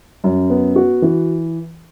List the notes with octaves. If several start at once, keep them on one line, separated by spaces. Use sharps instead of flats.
F#2
B3
F#4
E3